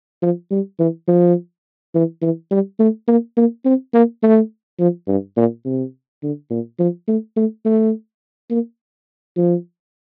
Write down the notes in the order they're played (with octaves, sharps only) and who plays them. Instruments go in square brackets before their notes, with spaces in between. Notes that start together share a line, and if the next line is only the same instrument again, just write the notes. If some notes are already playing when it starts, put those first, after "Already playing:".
[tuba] F3
G3
E3
F3
E3
E3
G3
A3
A#3
A#3
C4
A#3
A3
F3
G2
A#2
C3
D3
A#2
F3
A3
A3
A3
A#3
F3